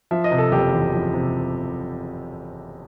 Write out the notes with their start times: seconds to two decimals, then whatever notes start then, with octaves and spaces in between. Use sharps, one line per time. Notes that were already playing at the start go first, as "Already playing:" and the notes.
0.11 F3 E5
0.24 D#5
0.31 C3
0.38 A4
0.52 F#1 G4
0.73 E2
0.93 F3
1.13 C3